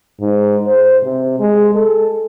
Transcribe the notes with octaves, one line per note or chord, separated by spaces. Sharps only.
G#2
C5
C3
G#3
A4